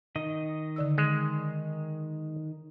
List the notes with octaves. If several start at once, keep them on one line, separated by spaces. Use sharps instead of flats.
D#3 D#5
D3 D5 E6
G#3